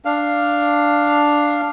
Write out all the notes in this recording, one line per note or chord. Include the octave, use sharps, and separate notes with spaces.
D4 F5